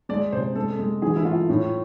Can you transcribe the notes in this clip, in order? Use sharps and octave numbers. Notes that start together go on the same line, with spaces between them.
G#3 D5
C3 C5
G#3 A4
G#3
E3 G#4
E4
A3 F4
A2